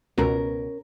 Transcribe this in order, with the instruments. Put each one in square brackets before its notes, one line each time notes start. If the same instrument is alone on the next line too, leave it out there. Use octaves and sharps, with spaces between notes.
[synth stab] C#2 B2 [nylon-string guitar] C#4 A#4